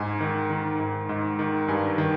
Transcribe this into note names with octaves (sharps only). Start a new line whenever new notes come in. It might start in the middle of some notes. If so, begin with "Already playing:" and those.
Already playing: G#2 G#5
D#3
D#3
G#2
G#2
D#3
G2 G#5
D#3